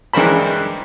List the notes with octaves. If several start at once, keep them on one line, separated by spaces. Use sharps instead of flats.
G2 E3 G#3 A#4 C5 B5